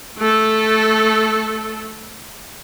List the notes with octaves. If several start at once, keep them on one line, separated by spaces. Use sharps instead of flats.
A3 A4